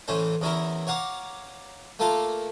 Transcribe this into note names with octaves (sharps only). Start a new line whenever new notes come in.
A1 E3 C#4 C5
E2 C#4 E4 A#4
C#5 F5 F#5 A#5 D6
A3 A#3 F4 A4 F5